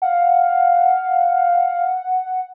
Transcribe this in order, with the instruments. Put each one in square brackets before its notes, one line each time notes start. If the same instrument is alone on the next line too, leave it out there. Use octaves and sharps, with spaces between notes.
[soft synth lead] F5 [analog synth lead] F#5